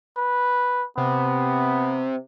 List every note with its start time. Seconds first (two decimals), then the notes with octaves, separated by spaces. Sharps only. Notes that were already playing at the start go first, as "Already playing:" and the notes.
0.17 B4
0.98 C3 B3